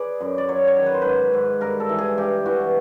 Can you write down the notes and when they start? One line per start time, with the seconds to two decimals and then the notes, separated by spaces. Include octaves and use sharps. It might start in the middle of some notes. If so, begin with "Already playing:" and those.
Already playing: G#4 B4 D5
0.21 F#2
0.38 D5
0.49 F#3 C#5
0.67 C#5
0.77 D#3
0.86 B4
0.94 C5
1.02 G#2 B4
1.33 G#2
1.61 G2 A#4
1.80 A4
1.89 E3
1.98 G#4
2.18 G2 G4
2.45 E3 F#4